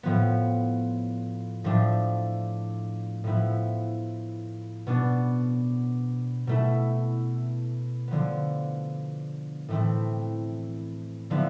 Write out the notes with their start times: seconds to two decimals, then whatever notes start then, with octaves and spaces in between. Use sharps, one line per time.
0.03 A2 F3 B3
1.64 A2 F3 A3 D4
3.24 A2 F3 B3 E4
4.87 B2 B3 D4
6.47 B2 A3 E4
8.08 D3 F3 B3
9.69 A2 E3 A3 C4 E4
11.30 D3 F3 B3 E4